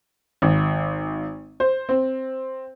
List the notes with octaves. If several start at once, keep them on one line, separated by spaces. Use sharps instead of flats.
G#1
C5
C4